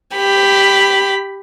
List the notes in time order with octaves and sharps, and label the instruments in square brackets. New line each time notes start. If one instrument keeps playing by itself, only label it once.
[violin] G4 B5